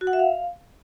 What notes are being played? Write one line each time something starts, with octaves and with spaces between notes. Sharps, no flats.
F#4
F#5
E5
F5